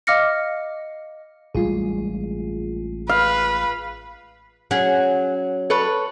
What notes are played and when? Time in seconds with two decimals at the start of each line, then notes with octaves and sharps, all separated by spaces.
0.07 D#5 F5 D6 F6 A#6 C#7
1.55 A1 G3 G#3 F4 G#4
3.09 B4 F5
4.71 F#3 C#4 G#4 F#5
5.70 A4 B4 C#5